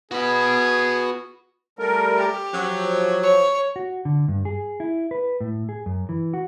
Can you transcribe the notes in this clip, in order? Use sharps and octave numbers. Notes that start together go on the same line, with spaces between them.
B3 F#4 G#4 B5
G3 A3 A#4
G4
F3 F#3
C#5
F#4
D3
G2
G#4
E4
B4
A2
G#4
F#2
E3
F#4